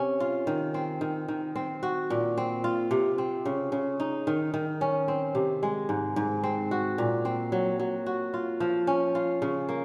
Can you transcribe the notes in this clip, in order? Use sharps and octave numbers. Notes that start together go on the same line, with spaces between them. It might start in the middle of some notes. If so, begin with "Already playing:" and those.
Already playing: C3 C#4
F4
D#3
C4
D#3
D#3
C4
F#4
A#2
C4
F4
C3
C4
C#3
C#3
D#4
D#3
D#3
C#4
C4
C3
G#3
G#2
G#2
C4
F#4
A#2
C4
F#3
F#3
F#4
F4
F3
C#4
F4
C#3
A#3